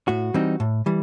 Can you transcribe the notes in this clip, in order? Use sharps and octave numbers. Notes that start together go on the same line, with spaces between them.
A2 F#4
E3 G3 C4 D#4
A2
E3 G3